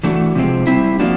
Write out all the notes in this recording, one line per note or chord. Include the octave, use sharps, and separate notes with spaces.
E3 A3 D4 F#4
C3 F3 G#3 C4
G3 C4 E4
F3 A#3 D4 F#4